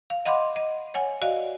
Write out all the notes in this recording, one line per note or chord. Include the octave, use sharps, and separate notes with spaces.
F5
D#5 F5 F#5 B5 C6 D6
D#5
C#5 F#5 G#5
F#4 D5 D#5 F5